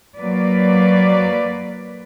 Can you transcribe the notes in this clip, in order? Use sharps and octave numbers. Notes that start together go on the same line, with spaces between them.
F#3 A#3 B4 D5